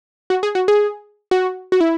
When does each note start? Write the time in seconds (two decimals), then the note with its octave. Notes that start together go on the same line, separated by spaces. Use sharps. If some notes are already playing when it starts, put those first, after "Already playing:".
0.30 F#4
0.43 G#4
0.55 F#4
0.68 G#4
1.31 F#4
1.72 F#4
1.81 E4